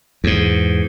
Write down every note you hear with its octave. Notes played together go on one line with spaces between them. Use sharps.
E2 G#2